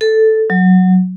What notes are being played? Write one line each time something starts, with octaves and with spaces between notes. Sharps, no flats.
A4
F#3